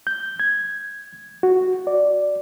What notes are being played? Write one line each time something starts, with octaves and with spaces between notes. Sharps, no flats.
G6
G#6
F#4
D5